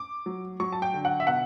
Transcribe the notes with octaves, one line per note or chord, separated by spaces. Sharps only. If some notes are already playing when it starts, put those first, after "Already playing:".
Already playing: D6
F#3
F#3 C#6
A5
G5
D3
F#5
E5
B2 F#5